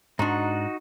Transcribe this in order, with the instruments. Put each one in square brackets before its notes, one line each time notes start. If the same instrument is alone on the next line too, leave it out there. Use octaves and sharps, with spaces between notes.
[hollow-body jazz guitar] G#2 D4 [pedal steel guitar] D#4 F#4